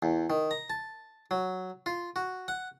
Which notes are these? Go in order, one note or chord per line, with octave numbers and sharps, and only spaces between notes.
E2
D#3
A#5
A5
F#3
F4
F#4
F#5